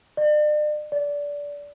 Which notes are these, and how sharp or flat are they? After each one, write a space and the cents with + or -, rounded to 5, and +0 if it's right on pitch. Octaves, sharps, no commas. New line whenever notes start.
D5 +40
D5 -20